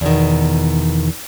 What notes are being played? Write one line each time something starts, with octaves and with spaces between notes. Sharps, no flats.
E2 B2 D#3